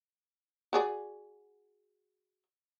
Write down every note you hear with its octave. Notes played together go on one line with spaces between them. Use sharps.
F#4 G#4 D5